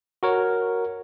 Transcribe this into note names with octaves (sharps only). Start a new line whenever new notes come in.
F#4 A#4 C#5